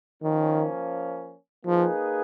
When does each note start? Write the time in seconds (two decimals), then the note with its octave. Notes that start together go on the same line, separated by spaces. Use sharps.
0.22 D#3 F3 A#3 C#4
1.66 F3 A#3 D#4 G#4 B4